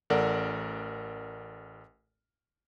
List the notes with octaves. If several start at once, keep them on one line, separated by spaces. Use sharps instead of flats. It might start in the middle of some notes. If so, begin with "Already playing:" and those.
A1 A4 A#4 D5 F#5